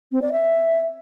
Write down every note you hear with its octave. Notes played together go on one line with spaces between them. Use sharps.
C4
D5
E5